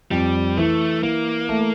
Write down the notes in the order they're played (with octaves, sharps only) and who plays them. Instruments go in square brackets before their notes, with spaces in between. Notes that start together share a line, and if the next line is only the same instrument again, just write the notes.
[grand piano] F2 [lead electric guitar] G3
[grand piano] E3 [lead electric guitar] A3
[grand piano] E3 [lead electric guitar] A#3
[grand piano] A3